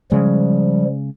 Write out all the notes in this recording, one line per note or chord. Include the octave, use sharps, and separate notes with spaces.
C#3 F3 G3 G#3